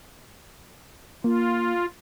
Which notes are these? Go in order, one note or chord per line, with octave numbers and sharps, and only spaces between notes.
A#3 F4